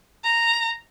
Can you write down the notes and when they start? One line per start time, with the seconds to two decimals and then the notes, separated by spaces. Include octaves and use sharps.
0.25 A#5